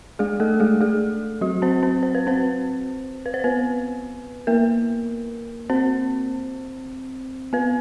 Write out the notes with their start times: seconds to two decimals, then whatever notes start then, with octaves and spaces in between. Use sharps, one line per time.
0.19 G#3 G#4
0.40 A3 A4
0.60 G#3 G#4
0.81 G#3 G#4
1.41 F#3 F#4
1.62 C4 C5
1.83 C4 C5
2.03 C5
2.15 B4
2.27 C4 C5
3.26 B4
3.34 C5
3.44 B3 B4
4.47 A#3 A#4
5.70 C4 C5
7.53 B3 B4